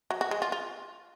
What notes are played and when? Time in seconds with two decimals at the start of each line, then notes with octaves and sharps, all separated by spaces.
0.11 F#3
0.21 F#4
0.31 G#3
0.42 F4
0.52 F4